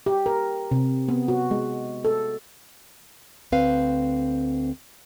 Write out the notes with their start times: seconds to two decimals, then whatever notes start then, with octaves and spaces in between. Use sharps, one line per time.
0.06 G4
0.26 A#4
0.71 C3
1.08 B3
1.28 F#4
1.51 G#3
2.05 A4
3.52 D2 C4 B4 F5